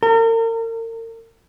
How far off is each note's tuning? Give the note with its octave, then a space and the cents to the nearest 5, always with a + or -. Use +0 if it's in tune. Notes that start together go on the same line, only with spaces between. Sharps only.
A#4 -40